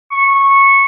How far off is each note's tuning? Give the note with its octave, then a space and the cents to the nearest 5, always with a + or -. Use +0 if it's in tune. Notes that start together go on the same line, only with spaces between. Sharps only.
C#6 -15